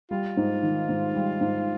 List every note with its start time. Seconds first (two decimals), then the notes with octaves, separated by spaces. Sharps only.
0.11 G3 F4
0.37 G#2
0.63 D#3
0.89 G#2
1.14 G3
1.41 G#2